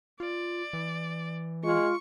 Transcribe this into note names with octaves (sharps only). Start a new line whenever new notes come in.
F4 D5
E3
G#3 F4 C#6